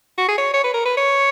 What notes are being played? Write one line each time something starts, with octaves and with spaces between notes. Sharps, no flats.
F#4
G#4
C#5
C#5
B4
A#4
B4
C#5